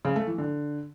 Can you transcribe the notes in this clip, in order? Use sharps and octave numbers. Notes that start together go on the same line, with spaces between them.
C#3
A3
E3
D3